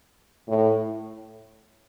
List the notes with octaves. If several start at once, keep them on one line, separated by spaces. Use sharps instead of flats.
A2